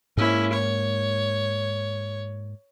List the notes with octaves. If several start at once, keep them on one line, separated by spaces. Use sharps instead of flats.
G#2 A#3 C#4 E4
C#5